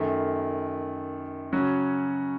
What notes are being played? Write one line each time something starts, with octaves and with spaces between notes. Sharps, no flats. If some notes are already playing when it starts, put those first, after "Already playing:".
Already playing: F#2 D#3 A3
C#3 F#3 C#4 F#4